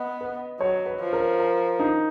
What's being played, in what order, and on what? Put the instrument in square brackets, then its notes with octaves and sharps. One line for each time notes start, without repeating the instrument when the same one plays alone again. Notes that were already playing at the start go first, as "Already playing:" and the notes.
Already playing: [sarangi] B3 [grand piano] D#5
[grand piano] B4
[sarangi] F#3 [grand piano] C#5
[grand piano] B4
[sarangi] F3
[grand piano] A#4
A#4
D#4